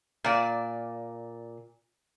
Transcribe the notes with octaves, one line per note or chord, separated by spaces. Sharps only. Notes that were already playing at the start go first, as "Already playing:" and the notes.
A#2 D5